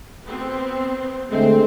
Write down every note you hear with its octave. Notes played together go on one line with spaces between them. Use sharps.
B3 C4
D3 G#3 A3 C4